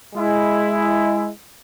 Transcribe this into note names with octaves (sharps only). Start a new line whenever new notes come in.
G#3 E4